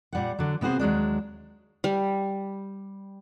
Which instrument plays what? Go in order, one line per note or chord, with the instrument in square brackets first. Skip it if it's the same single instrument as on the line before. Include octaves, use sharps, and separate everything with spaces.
[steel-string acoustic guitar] A#2 G3 F#5
D3 F#3
C3 B3 F#4 G#4 C5
D#2 F#3 G#3 D4
[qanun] G3